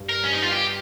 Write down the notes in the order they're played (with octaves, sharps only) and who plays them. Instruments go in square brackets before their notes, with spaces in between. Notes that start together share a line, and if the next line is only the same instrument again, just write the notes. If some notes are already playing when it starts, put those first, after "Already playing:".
Already playing: [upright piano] G2
[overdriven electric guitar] A#4
C#4
D#4
F4
G4